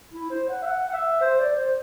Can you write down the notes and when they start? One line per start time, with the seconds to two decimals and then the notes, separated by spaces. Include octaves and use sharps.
0.12 E4
0.30 C5
0.49 F#5
0.62 E5
0.66 F#5
0.88 F#5
0.93 E5
1.21 C5
1.39 D5
1.57 C5